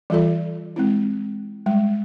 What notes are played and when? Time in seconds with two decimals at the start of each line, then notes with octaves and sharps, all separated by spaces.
0.10 E3 G3 F4 A4 D5
0.76 G#3 C4 E4
1.66 G3 G#3